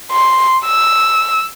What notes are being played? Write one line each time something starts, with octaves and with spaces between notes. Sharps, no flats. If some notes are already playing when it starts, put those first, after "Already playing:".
C6
E6